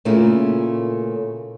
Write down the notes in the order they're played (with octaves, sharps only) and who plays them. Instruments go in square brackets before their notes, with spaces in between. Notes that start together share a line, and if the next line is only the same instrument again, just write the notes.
[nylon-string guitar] A#2 C#3 A3 A#3 C#4 E4